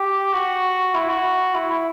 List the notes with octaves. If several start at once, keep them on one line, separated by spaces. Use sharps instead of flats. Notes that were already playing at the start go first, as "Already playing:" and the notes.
Already playing: G4
F#4
E4
F#4
E4
E4